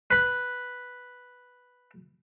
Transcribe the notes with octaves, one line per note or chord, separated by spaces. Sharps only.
B4 B5